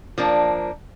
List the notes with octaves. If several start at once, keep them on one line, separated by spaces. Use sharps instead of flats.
F3 A#3 D4